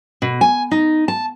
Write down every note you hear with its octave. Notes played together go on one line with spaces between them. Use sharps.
B2
G#5
D#4
A5